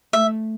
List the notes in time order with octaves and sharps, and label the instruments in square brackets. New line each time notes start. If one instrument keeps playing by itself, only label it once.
[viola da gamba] A3 [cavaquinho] E5